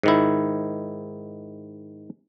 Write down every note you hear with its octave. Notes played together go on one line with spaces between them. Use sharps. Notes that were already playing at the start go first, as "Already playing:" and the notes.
G#2 D#3 E4